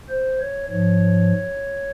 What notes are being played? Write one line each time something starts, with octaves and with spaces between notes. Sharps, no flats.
C5
C#5
G#2 F3 C#5